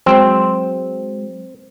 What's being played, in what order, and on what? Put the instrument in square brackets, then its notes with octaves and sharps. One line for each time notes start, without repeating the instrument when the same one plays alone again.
[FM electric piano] F#3 G#3 [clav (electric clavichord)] C4